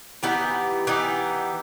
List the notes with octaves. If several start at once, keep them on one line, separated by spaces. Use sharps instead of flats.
E3 B3 D#4 G4
E3 B3 D#4 G4